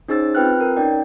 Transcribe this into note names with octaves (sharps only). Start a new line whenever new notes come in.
C#4 D#4 G#4 C5 E6 A6
C4 F4 B4 G5 F6 F#6
A#4
C#4 D#4 D5 G5